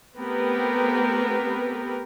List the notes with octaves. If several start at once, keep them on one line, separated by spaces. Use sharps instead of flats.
A3 B3 C4 G4 A#4 B4